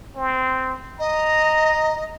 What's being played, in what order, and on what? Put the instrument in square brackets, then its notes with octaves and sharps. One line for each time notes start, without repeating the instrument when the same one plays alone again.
[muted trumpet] C4
[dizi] D#5 [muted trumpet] A#5